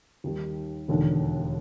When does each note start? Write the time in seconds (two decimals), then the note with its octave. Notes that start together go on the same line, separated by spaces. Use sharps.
0.24 D#2 D#3 G3
0.88 E1 D#2 D3